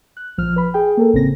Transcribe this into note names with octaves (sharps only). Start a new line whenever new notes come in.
F#6
A#1 F3 F6
B4 B5
G#4 G5
A#3 A4 A#4
A1 C#3 C4 A#6